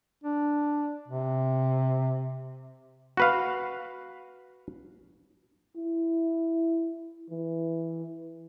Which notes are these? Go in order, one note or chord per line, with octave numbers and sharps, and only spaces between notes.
D4
C3
F#4 B4 F5
E4
E3